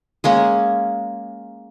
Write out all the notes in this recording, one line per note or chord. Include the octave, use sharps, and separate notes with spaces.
G#3 A#3 C#4